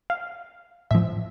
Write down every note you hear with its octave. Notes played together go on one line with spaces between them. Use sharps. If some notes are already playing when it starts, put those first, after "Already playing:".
F5
A2 F3 E5